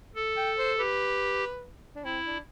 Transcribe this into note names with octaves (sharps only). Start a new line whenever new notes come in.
A4
G5
C5
G4 B4
D4
C4 E4
D4